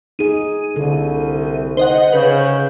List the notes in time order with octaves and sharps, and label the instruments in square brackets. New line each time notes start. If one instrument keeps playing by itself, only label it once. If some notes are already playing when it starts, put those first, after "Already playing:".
[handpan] D#4 G#4 [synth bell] D#7
[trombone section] C2 [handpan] D3 A4
[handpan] D#4 [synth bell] C5 D#5 F#5
[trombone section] C#3 [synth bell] B4 G6